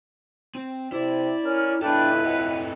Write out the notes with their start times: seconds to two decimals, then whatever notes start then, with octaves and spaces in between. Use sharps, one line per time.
0.55 C4
0.92 C3 E4 D5
1.44 C#4 A#4 F6
1.82 C#2 B3 D4 E4 A4 B4 D5 G5
2.25 A3 C4 D#5 F#5